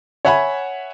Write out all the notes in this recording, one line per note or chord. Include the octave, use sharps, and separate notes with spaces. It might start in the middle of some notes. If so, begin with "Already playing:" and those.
C#5 E5 F#5 G#5 B5